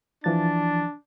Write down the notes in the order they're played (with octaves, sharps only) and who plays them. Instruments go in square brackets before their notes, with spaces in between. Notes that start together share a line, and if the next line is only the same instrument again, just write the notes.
[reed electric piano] E3 F3 A6 [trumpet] D4